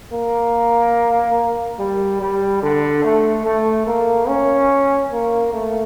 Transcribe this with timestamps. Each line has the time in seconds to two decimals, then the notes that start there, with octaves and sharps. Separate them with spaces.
0.13 A#3
1.79 G3
2.21 G3
2.62 D3
3.04 A3
3.45 A3
3.87 A#3
4.28 C#4
5.12 A#3
5.53 A3